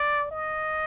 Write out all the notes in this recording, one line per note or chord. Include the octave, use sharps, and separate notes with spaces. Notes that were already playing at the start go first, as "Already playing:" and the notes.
Already playing: D5
D#5